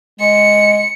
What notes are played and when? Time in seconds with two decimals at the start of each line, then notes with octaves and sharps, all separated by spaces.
0.20 G#3 C#7